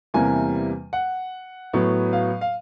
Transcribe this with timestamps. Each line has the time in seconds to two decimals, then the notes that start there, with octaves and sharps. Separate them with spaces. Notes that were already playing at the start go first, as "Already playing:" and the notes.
0.14 E2 C3 E3 G3 A#3 G#5
0.93 F#5
1.73 A2 F#3 B3
2.13 F5
2.41 F5